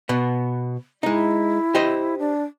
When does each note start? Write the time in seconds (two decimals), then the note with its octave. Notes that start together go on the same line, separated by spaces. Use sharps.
0.09 B2 B3
1.03 G#3 D#4 E4
1.74 G4 C5 D#5
2.19 D4